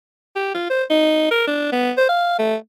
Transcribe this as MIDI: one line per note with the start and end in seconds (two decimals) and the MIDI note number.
0.35 0.50 67
0.54 0.67 65
0.70 0.83 72
0.90 1.28 63
1.31 1.44 70
1.48 1.70 62
1.72 1.92 59
1.97 2.08 72
2.09 2.39 77
2.39 2.56 57